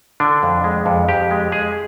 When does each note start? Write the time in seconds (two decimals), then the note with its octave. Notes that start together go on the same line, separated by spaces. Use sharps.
0.20 D3 D4
0.43 F2
0.64 G#3
0.86 F2
1.08 F2 G4
1.31 G#3
1.52 G#3 G#4